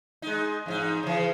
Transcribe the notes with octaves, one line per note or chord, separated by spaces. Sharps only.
G#3 D#4
E2 G#2 D#4
C#3 E3